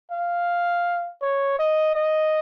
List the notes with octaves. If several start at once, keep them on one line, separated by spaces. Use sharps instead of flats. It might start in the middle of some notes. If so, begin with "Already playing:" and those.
F5
C#5
D#5
D#5